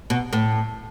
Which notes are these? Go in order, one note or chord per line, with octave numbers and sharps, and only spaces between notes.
B2
A2